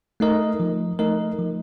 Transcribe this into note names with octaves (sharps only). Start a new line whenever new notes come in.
A3 D#4 A#4 D#5
F3
A3 D#4 A#4 D#5
F3